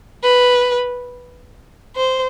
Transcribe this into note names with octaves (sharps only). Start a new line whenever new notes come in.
B4
C5